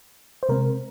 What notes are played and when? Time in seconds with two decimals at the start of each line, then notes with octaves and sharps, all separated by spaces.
0.43 C5
0.49 C3 G#3 C4 A#4